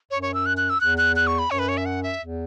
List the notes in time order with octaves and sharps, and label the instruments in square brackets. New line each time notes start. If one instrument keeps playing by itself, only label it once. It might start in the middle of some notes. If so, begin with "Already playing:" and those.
[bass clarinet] F#2 [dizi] C#5
[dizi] C#5
E6
F#6
F#6
E6
[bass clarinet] E2 [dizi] F#6
[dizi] F#6
F#6
C#6
B5
[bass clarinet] F#2 [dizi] C#5
[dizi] B4
C#5
E5
F#5
E5
[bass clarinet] E2